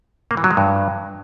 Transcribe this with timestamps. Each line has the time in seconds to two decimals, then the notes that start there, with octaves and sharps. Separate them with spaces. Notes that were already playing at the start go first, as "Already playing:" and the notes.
0.31 A#3
0.37 E3
0.44 F#3
0.51 G#3
0.57 G2